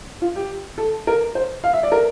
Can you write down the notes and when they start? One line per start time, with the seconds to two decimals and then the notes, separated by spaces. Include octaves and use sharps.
0.22 F4
0.36 G4
0.78 A4
1.07 A#4
1.35 C5
1.64 F5
1.73 E5
1.83 D5
1.92 A#4